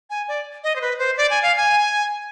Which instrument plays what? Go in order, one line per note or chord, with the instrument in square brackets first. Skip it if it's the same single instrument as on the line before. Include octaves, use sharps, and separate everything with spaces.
[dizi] G#5
D5
D#5
C5
B4
C5
D5
G#5
F5
G#5